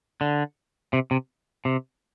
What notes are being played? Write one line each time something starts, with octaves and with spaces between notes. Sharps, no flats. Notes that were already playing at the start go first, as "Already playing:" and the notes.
D3
C3
C3
C3